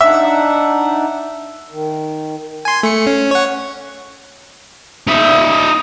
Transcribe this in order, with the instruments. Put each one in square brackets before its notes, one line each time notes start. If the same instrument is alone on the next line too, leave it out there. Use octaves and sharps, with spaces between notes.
[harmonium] D4 D#4 F#5 [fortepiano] E5
[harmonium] D#3
[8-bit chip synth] G#5 C6
A3 C#7
C#4
C#5 F#5
[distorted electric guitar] D#4 E5